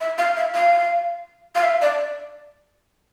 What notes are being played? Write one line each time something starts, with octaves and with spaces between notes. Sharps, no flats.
E5
F5
E5
F5
F5
E5
D5